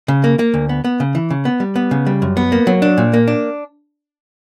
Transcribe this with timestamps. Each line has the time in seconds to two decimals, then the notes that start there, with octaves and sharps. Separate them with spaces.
0.08 C#3
0.24 A#3
0.39 A#3
0.54 D2
0.69 B3
0.84 B3
1.00 C#3
1.15 E3
1.30 C#3
1.45 B3
1.60 G3
1.76 B3
1.91 C#3
2.06 G3
2.22 F#2
2.37 B3
2.52 A#3
2.67 F#3
2.82 D4
2.98 A#2
3.13 A#3
3.28 D4